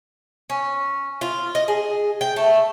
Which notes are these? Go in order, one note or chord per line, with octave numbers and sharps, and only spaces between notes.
C#4
F4
D#5
G#4
G5
A3